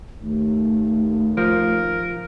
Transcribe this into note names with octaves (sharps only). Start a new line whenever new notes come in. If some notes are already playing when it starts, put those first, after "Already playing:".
D#2 A3
F3 A#4